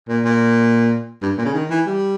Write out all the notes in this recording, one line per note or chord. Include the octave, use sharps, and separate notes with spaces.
A#2
A#2
G2
A#2
C#3
D#3
E3
G3